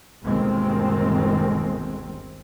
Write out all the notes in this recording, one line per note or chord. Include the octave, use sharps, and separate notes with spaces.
G1 D#2 B2 D#3 G#3 C4